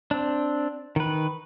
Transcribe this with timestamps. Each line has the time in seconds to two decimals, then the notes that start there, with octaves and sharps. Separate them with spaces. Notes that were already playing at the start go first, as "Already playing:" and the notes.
0.11 C4 D4
0.96 D#3 B4